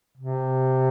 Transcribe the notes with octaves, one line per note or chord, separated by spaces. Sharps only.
C3